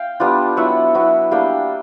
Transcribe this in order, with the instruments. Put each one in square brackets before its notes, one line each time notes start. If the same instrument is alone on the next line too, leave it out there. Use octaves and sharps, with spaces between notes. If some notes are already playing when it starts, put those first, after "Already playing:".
Already playing: [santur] F5 G5
G3 B3 D4 F4
F#3 B3 E4 E5 F#5
F#3 B3 E4
G3 A#3 D4 F5 G5